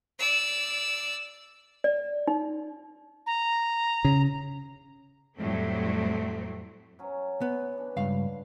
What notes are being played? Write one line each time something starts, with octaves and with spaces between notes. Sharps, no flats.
D5 E6
D5
D#4
A#5
C#3
F2 A2 F#3 G3 A3 C4
F#3 C#4
B3
E3 D4
C#2 G2 F5